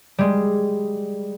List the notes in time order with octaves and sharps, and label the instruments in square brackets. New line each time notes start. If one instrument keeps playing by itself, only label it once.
[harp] G3 G#3